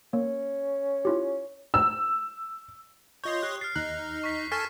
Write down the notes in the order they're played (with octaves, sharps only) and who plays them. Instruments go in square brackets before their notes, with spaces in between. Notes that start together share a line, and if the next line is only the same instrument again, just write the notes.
[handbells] A#3 [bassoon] C#4
[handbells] E4 F4 G4
[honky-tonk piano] E6
[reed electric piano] F4 G6 [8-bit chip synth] C#5 D#5 C6
[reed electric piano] G4 [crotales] F#6
[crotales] F6 C7 [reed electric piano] A6
[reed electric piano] D#2 F#6 [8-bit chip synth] D#4
[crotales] C#6 B6
[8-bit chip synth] A4 G#5 A5 [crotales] C#6 F6 B6